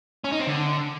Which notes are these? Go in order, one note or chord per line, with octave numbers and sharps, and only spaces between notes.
C#4
D#4
C4
D3